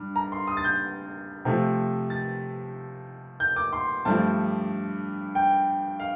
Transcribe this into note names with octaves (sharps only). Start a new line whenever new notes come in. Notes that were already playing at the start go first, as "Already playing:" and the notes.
Already playing: G2
A#5
C6
D#6
A6
G6
C3 F3 A3
A6
G6
D6
C6
G2 F3 A3 A5
G5
F5